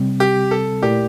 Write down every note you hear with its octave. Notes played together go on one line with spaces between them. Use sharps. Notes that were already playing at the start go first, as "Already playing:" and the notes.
Already playing: C3 G3 C4
G4
A4
A#2 A3 E4 G4 A#4 D5